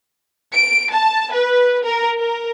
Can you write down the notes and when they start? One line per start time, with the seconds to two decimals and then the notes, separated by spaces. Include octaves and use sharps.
0.54 D7
0.93 A5
1.33 B4
1.84 A#4
2.19 A#4